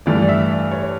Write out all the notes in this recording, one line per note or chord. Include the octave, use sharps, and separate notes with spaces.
G2 E3 A3 D5
D5
E5
D5
C#5